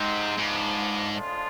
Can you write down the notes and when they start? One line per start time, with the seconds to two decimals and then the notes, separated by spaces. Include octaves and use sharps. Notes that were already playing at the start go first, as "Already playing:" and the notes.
Already playing: G#2 C3 G#3 C4
0.37 G#2 F3 B3 D4
1.12 A2 F3 G#3 D4 F4